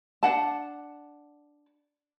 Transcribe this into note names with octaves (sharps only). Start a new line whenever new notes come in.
D4 F#5 A5